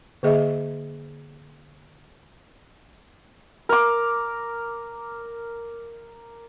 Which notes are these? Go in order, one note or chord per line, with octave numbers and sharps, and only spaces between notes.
D3 A#3 G#4 D#5 E5
A#4 D6